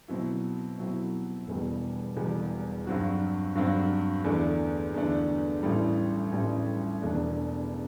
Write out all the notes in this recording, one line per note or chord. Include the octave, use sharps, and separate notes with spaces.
B2 F#3 C4 E4
B2 F#3 C4 E4
E1 E2 B2 G3
E1 E2 B2 G3
G2 F#3 C4 F#4
G2 F#3 C4 F#4
E2 D3 A3 D4
E2 D3 A3 D4
A1 A2 G3
A1 A2 G3
E1 E2 B2 A3 D4